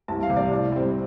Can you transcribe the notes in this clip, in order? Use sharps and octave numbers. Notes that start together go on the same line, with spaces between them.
C2 A5
F5
C3 G3
D5
A2
G3 C4